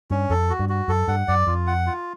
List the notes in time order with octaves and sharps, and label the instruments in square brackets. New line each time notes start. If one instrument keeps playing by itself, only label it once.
[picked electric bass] G2 [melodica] C#4
[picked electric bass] F2 [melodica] A4
[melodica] F#4
[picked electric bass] G2
[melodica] F#4
[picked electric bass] F#2 [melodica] A4
[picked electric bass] G2 [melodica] F#5
[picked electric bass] F#2 [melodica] D5
[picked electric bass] F2 [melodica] F4
[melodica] F#5
F4